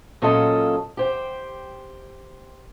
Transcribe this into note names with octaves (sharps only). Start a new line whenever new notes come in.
A#2 F#3 C#4 F4 A4 D#5
G4 C5 G5